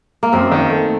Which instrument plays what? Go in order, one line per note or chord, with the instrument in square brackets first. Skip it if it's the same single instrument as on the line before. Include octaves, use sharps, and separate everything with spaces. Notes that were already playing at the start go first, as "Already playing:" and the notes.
[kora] A#3
[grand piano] F#2 [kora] C4
[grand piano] D#3
A3